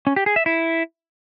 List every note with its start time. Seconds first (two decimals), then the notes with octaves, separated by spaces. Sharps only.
0.07 C#4
0.16 G4
0.26 G#4
0.36 E5
0.46 E4